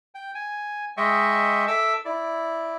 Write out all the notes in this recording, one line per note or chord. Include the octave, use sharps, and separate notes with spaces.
G5
G#5
G#3 D#5 E5 G5 C#6
A4 E5 D6 E6
E4 D5